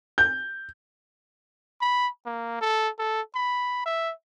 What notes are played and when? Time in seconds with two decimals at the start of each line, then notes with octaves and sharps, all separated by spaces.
0.18 G6
1.81 B5
2.26 A#3
2.61 A4
2.99 A4
3.35 B5
3.85 E5